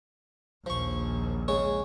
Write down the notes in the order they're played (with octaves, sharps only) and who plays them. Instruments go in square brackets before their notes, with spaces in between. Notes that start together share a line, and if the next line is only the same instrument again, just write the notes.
[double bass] A#1 D#2 [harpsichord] F3 C#6
[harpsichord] C#3 G#3 C#5